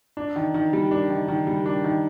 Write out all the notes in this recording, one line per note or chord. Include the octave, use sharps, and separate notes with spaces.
D4
D#3
D#3
G3
D4
D#3
D#3
G3
D4
D#3